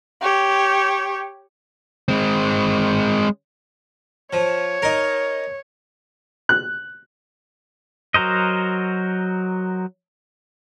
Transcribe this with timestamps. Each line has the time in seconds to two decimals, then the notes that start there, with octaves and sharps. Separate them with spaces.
0.21 G4 C#5
2.08 G#3 C4
4.33 F3 C#5
4.82 D#4 A#4
6.49 F#6
8.14 F#3 F#4 A#4 C5 D#5